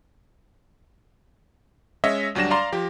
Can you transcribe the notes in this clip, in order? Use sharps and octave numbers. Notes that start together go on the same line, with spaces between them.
G#3 C#4 C#5 D#5 E5
D2 F#3 G3 D4 A#6 E7
D5 F5 A#5 C6
F3 G4